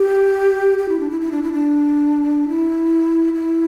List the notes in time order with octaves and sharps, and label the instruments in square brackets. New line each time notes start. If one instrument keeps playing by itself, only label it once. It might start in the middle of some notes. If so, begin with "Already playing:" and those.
Already playing: [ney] G4
G4
E4
D4
E4
E4
D4
E4
D4
E4
E4